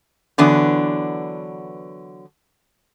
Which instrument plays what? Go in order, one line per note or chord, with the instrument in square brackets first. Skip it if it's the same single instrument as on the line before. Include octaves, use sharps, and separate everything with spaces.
[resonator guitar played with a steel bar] D3 E3 F#3 B3 D4